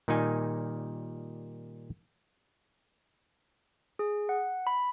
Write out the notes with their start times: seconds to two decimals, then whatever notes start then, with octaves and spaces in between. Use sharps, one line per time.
0.08 A#2 D#3 G3 D#4 G#5
3.99 G#4
4.29 F#5
4.67 B5